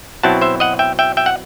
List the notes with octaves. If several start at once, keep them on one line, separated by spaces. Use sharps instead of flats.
B2 F#3 C4 E4 F#5 A5
C5 E5
D#5 F#5
E5 G5
E5 G5
E5 G5
F#5